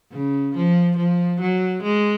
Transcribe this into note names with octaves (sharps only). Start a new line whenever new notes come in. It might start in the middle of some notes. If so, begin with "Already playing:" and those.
C#3
F3
F3
F#3
G#3